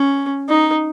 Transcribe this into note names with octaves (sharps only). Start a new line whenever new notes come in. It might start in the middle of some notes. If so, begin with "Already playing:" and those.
Already playing: C#4
D#4